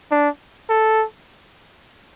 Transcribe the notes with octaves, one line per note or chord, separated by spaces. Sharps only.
D4
A4